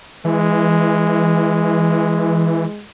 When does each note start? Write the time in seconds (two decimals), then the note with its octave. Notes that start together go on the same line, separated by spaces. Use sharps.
0.25 E3 G#3